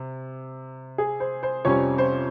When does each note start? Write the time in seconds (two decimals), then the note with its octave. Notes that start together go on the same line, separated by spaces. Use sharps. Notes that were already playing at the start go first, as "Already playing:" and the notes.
Already playing: C3
0.98 G#4
1.20 C5
1.43 C5
1.65 F2 C3 G3 C#4 C#5
1.98 C5